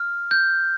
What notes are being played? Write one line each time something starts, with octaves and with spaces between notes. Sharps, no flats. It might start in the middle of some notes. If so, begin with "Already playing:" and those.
Already playing: F6
G6